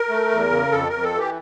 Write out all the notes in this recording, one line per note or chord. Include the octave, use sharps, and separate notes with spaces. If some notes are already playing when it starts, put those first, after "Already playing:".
Already playing: A#4
A3
E2
C#3
F2 A4
F2 A#4
A4
E3 G4